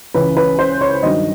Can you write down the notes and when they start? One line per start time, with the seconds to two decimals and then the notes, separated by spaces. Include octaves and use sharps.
0.14 C#2 C#3 E3 B4
0.37 B4
0.59 C5
0.81 C#5
1.03 G2 D#3 F#3 D#5